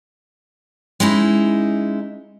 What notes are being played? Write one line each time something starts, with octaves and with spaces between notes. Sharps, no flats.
G#3 C#4 D#4 E4